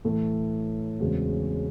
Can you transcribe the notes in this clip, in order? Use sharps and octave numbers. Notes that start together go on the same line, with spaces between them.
A2 E3 A3
E2 C#3 G#3 C4 F#4